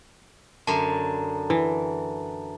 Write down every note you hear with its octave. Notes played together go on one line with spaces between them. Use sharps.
F#2 D3 A5 A#5
E3